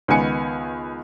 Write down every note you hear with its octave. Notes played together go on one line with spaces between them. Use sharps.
C#2 D#3 B3 G#5 C#7